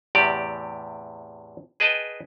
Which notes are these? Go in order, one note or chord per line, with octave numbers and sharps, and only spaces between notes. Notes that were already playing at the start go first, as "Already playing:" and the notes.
E2 A2 C3 G4 D5
G#4 B4 D#5 G5 A5